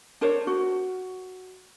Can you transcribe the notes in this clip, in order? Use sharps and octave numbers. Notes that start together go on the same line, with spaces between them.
D4 A#4 C5 C#5
F#4